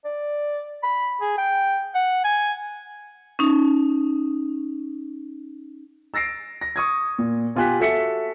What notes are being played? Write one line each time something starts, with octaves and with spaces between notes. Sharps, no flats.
D5
B5
G#4
G5
F#5
G#5
C#4 D#4
E6 A6 A#6 C7 D7
A#6
C#6 D#6 G#6
A#2
B2 F4 G4 G#5 F#6 B6
F#4 A4 E5 B6 C#7